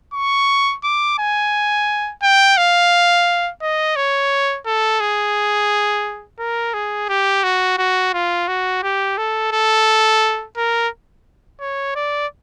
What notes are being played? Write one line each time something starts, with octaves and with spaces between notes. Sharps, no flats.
C#6
D6
G#5
G5
F5
D#5
C#5
A4
G#4
A#4
G#4
G4
F#4
F#4
F4
F#4
G4
A4
A4
A#4
C#5
D5